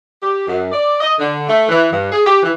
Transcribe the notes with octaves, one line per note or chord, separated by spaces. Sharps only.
G4
F#2
D5
D#5
D3
A3
E3
G2
G#4
G4
E3